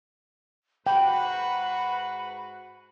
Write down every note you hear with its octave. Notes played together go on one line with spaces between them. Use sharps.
G#2 F#4 B4 G5 B5